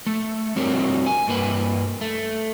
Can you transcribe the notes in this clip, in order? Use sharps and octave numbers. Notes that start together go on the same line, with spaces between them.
A3
G3 C4 F#4 A#4 C#5
G#5
G2 A#3 B4
A3